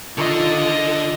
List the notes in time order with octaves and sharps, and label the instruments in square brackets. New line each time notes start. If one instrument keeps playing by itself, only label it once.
[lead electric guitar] D3 [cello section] D#3 F4 A4 [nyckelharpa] D#5